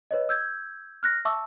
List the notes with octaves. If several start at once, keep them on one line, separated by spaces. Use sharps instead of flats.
B4 C#5 D#5
E6 G6 G#6
F6 F#6 A#6
E5 A5 C#6 D6 E6